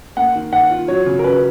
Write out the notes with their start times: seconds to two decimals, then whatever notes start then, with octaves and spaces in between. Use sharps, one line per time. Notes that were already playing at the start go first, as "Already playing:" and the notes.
0.17 A#3 F#5
0.35 D#3
0.53 D#3 F#5
0.70 F4
0.88 F#3 C#5
1.06 C#3
1.19 A#4
1.24 C#4 B4